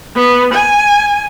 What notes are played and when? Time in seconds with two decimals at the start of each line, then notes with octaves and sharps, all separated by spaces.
0.15 B3
0.54 G#5